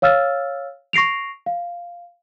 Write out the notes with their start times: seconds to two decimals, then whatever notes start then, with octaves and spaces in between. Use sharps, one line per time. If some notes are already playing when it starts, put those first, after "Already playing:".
0.02 C#5 F5 E6 F6 A6
0.93 C#6 A#6 C7 D7 F7
1.46 F5